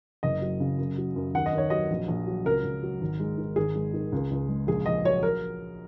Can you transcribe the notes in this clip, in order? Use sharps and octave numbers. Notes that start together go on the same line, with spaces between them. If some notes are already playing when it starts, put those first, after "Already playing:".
F#1 D#5
F#3
C#3
F#2
F#3
F#2
D#2 F#5
D#5
D#2 C#5
F#3 D#5
A#1
A#1
F#3
C#2 A#4
C#2
F#3
G#1
G#3
D#3
G#1 G#4
G#3
D#3
C#2
C#2
G#3
A#1 G#4
A#1 D#5
F#3 C#5
A#4